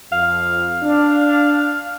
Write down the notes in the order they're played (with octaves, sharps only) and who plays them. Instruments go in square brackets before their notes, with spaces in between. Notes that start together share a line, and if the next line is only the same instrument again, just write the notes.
[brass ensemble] F2 [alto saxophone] F5
[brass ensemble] D4